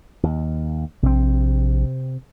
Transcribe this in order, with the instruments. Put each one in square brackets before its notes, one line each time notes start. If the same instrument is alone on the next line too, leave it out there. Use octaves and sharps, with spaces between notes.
[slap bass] D#2
[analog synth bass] A#1 [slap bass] C3 C4